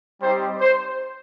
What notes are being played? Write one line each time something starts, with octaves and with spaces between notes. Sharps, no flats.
G3 C4 D#4 G4 C5
C5